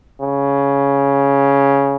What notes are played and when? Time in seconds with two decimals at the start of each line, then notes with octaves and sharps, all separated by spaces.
0.22 C#3